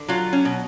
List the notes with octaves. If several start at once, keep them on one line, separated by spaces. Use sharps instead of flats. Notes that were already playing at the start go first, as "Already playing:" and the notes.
Already playing: D3
F#3 F4
C#4
B2